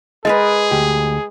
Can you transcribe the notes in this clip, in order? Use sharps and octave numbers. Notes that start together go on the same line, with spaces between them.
G#3 G#4 A#4 B4 D#5
D2 G4